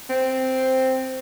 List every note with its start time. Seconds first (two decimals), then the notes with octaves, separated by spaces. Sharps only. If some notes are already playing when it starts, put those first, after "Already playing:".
0.10 C4